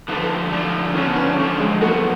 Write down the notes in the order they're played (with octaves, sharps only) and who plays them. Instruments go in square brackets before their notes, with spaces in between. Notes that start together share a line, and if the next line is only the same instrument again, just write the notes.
[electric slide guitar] D3 F3 A3 [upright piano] B4
[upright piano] A4
[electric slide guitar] D3 F3 A3 [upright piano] D4
[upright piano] D4
[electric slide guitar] D3 F3 A3 [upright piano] C#4
[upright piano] B3
C#4
D4
[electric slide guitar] D3 F3 A3 [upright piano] C#4
[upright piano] G#3
[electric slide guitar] F#2 F3 B3 F#4 [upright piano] A3